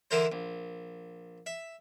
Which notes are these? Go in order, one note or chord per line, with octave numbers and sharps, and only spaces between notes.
D3 E3 E4 A#4 C5
A#1
E5